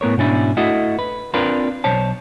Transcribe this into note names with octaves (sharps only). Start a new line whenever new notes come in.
A2 B3 A#4 C#5
G#2 B2 C#4 D4 E4
A3 E4 F#4 D#5
B4
C4 D4 F4 A#4 B4
B1 C5 C#5 A5